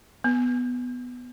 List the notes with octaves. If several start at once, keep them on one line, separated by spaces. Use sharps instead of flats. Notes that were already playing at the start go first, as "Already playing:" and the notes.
B3